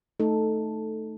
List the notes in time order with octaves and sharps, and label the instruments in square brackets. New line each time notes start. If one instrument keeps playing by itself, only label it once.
[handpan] A3 D#4 A4